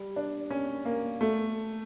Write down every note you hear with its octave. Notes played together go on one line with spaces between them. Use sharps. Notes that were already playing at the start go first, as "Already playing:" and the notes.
Already playing: G3
D4
C#4
A#3
A3